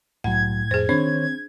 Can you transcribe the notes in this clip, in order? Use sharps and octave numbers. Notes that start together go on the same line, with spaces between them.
C2 A2 F#3 F#5 G#6
F2 G#4 C5
D#3 C4 D4 C5 C#5